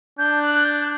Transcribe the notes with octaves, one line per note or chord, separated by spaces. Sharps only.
D4 G6
F#6
G6